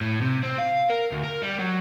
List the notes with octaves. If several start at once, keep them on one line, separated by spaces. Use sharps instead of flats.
A2
C3
C4
F5
A#4
D2
A#4
G3
F#3